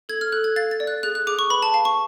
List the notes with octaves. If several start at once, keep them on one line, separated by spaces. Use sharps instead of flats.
A4 G#6
F6
A4 F#6
G#6
F5 A6
A6
D5
F#6
G#4 F#6
F#6
G#4 D6
C#6
B4 B5
A5
F5 A5
C#6